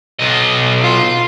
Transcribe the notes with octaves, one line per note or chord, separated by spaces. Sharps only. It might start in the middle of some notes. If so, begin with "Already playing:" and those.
B1 D#5
F4